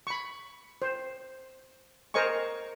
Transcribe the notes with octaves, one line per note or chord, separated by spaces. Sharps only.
B5 C#6
C5
A#4 C5 D#5 G#5 C#6